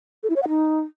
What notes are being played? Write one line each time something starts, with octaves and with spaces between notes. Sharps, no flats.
A4
E4
C#5
F#5
D#4